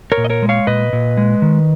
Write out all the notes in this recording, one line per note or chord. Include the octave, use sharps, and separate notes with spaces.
A#4 C#5
A#2
D#5
A#4 C#5
G#3
C#5 F5
A#2 B4 D#5
A#2
G#3
D#3